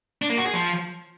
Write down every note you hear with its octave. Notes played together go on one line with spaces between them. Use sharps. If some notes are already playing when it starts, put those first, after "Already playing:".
D4
A#3
F#4
G#4
F3